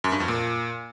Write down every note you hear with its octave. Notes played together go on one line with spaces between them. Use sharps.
F#2
G2
F2
A#2